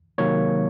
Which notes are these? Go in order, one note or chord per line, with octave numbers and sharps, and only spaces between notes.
C3 D#3 F#3 A#3 C#5